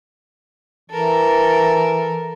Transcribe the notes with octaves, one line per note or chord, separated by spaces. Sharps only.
E3 A4 A#4